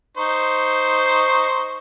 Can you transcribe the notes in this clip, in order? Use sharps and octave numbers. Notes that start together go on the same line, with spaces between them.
D#4 C5 C#6